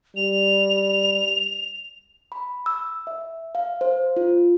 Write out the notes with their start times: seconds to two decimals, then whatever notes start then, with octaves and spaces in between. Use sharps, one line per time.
0.16 G3 F7
2.32 B5
2.66 E6
3.07 E5
3.55 F5
3.81 C5
4.17 F4